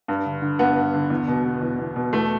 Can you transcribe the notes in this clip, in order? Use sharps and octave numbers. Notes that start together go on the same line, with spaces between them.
G2
D3
D3
G2 B3
G2
D3
E2
B2
B2
E2
E2
B2
E2 A3